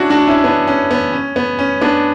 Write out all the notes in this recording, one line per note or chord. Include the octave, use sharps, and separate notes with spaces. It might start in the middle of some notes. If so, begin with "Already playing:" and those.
Already playing: C#4 D4 E4 F#4
D4 F#4
C#4 E4
B3 D4
C#4
B3
C#4
B3
C#4
B3 D4